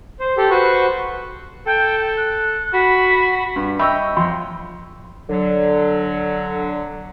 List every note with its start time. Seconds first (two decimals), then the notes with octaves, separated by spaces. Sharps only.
0.20 C5
0.37 G4 A4
0.50 F#4 B4 C5 C#6
1.66 A4 G5
2.17 F#6
2.73 F#4 B5
3.56 G2
3.79 C#5 D#5 E5 G5 B5 C#6 E6
4.17 F2 C6
5.29 D3 F#3